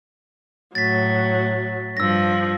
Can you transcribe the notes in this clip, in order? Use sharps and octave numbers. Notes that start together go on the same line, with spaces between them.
A2 F#3 A6 B6
G2 F3 E6 A#6